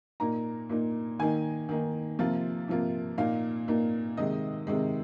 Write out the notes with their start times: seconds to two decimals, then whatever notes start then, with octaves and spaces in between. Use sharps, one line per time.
0.20 A#2 A#3 D#4 A#5
0.70 A#2 A#3 D#4
1.19 D#3 A#3 D#4 G#5
1.69 D#3 A#3 D#4
2.19 C3 F3 A#3 F4
2.68 C3 F3 A#3 F4
3.18 A#2 A#3 D#4 F5
3.68 A#2 A#3 D#4
4.17 C3 D#3 G#3 D#5
4.67 C3 D#3 G#3